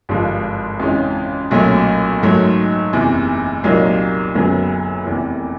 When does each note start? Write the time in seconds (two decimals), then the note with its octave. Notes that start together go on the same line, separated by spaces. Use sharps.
0.09 G#1 G2 D3 F3 G#3
0.79 F2 C#3 E3 G#3 C#4
1.51 B1 A#2 F#3 A3 C#4
2.22 G#2 D#3 F#3 A3
2.93 F#1 E2 C3 E3
3.64 C2 A#2 F#3 A#3 D#4
4.35 F#1 F#2 D3 F#3 B3
5.06 F1 E2 C3 E3